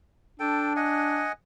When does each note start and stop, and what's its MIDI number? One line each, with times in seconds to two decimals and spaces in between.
0.40 1.26 62
0.40 0.73 69
0.40 0.73 79
0.76 1.32 75
0.76 1.32 78
0.76 1.32 80